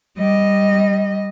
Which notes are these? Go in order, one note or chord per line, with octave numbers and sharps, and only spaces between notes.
G3 D#5